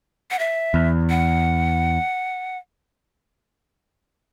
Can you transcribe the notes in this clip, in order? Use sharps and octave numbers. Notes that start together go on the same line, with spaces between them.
F#5
E5
E2
F#5